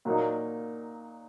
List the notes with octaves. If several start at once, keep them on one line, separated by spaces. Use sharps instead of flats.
A#2 F#3 A#3 D#4